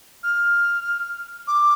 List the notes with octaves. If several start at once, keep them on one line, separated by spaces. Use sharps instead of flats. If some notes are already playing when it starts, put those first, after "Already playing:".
F6
D6